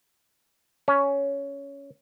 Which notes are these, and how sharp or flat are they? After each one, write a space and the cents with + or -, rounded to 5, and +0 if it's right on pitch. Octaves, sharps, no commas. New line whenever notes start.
C#4 +10